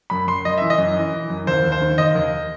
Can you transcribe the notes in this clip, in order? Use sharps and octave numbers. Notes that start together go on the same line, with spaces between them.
F#2 B5
F#2 C6
F#2 D#5
E3 E5
D#5
F#2
E3
E3
F#2
D#2 C5
D#2
C5
D#3
D#2 D#5
D#2